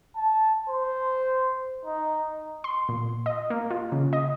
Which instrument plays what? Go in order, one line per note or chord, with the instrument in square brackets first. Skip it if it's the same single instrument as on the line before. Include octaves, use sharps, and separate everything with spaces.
[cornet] A5
C5
D#4
[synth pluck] C6
A#2
D#5
A#3
F4
C#3
D#5